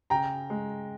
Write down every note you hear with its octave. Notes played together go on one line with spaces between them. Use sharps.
C#3 G5 A#5
G#3